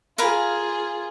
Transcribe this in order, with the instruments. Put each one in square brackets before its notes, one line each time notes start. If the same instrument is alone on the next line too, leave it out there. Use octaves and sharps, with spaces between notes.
[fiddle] F4 G#4 [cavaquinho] A#4 F5 B5